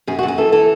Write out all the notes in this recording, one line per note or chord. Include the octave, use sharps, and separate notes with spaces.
F#2 G#4
F#4
F#2
G#4
E3 A4
E3 A4